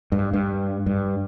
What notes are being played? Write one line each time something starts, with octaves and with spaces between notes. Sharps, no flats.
G2
G2
G2